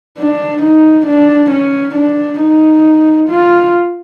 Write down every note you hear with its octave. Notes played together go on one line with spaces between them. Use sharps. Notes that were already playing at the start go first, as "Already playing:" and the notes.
D4
D#4
D4
C#4
D4
D#4
F4